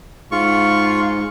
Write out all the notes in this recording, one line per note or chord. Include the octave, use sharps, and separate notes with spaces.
G#2 F4 C#6